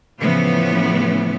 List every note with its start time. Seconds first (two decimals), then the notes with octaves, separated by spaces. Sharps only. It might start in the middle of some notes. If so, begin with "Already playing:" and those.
0.19 A2 C#3 E3 F3 B3